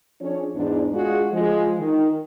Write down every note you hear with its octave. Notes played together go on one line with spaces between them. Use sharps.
F3 C#4 D4 G#4 C#5
E2 G#2 D4
G#3 D4 F4 F#4 G#4
F3 G#3 F4
D#3